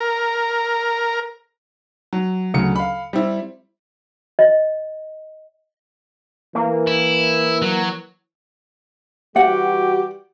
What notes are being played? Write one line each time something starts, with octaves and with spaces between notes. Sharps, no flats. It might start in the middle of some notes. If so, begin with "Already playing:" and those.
A#4
F#3
D2 C#3 F#3 C#7
F5 B5
G3 C4 E4
D#5
E3 A#3
E4
F#3
E3 G3 F#4 G4 F#5